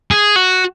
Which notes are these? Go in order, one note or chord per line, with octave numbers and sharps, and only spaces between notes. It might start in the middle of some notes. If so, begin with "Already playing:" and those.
G#4
F#4